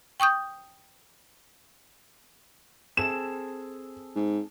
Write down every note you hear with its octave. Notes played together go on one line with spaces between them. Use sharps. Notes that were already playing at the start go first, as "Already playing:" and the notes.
G5 C#6 D#6 G6
C4 G#4 A4 E7
G#2